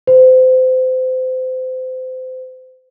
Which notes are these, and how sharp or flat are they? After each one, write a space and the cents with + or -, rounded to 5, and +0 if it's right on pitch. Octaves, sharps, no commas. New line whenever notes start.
C5 -30